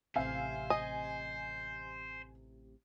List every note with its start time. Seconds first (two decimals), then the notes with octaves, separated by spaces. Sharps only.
0.16 A1 C3 C5 E5 F5 G#5
0.70 D#5 G#5